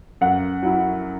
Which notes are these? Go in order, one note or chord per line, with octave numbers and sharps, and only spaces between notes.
F#2 F#5
F#3 E4